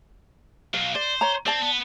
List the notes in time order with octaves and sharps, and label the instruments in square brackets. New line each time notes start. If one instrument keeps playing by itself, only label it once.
[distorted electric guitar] B2 F#3 [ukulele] F5
[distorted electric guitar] C5 [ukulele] D5
[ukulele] C#5 A#5
[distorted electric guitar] C4 [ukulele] D5 A5
[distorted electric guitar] B3